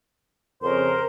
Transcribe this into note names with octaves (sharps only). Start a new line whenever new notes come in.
F2 C#3 A#4 C5